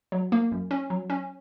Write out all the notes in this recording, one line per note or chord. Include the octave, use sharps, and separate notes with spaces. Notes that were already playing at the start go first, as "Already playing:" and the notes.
F#3
A#3
F#2
C#4
F#3
C#4